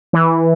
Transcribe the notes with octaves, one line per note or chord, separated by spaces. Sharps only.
E3